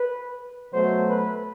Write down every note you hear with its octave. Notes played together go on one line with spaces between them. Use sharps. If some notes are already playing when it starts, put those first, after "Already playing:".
Already playing: B4
B2 F#3 A3 C5
B4